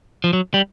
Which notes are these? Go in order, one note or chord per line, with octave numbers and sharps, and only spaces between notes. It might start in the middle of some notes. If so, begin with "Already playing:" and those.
F3
F#3
G3